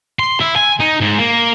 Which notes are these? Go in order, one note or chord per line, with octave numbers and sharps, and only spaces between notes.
C6
E4
G#5
D#4
G#2
A#3